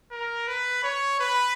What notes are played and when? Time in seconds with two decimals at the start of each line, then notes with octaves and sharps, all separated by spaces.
0.11 A#4
0.48 B4
0.83 C#5
1.20 B4